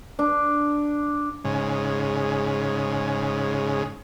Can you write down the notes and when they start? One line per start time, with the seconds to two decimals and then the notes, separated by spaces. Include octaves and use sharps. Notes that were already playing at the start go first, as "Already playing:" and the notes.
0.19 D4
1.45 G#2 C#3